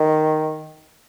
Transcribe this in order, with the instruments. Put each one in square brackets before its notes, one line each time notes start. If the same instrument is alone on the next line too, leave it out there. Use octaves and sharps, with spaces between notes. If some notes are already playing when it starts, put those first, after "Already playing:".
Already playing: [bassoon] D#3